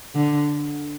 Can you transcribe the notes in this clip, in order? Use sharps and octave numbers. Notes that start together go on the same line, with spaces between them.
D3